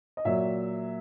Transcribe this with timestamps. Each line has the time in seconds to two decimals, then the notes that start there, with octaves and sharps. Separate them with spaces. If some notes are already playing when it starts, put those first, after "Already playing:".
0.17 D#5
0.25 A#2 F#3 E5